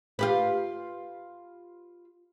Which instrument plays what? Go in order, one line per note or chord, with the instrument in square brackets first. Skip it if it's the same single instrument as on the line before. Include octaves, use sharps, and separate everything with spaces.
[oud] F4 G4 B4